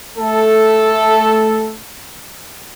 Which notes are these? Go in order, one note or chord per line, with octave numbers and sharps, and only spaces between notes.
A3 A4